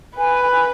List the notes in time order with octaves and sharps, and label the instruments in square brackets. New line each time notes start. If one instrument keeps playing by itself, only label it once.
[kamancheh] B4 [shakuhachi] G#5